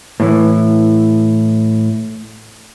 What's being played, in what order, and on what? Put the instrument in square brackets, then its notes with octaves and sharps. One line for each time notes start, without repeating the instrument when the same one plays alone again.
[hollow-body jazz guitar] A2 E3